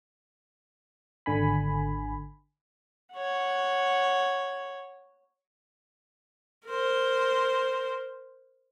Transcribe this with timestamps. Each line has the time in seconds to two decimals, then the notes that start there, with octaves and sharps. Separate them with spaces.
1.26 G#1 D3 G#5 B5
3.14 C#5 F#5
6.66 A#4 C5